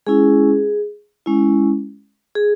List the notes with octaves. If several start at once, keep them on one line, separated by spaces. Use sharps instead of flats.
G#3 C#4 E4 G#4
G#3 C#4 E4
G#4